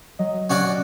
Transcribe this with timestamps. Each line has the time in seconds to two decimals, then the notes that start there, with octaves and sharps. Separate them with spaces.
0.19 F#3 D#5
0.50 C#4 F#4 D5